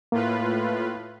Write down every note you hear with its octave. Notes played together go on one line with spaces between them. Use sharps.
A2 A#3 F4 B4